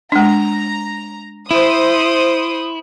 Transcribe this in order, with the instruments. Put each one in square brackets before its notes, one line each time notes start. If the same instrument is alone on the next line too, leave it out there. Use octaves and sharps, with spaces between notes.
[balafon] G#3 D4 [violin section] A#5
[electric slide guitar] E4 [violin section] C5 D#6